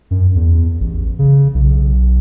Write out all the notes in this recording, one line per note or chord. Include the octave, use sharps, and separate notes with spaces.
F#2
E2
A1
C#3
B1